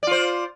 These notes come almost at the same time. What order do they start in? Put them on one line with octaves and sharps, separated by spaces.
D5 F4 C5